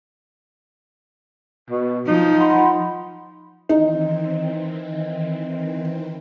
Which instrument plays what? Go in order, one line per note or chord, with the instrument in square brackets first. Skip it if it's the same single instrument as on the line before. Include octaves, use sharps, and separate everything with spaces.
[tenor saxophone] B2
[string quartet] F3 [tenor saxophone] D#4
[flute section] F#5 B5 C6
[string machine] D#3 E3 C4 [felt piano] D#4